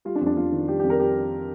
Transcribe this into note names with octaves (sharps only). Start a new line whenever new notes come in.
G3 F4
D4
F2
D4
F2 F4
D#3
G3 G4
G4
F2
A#4
G4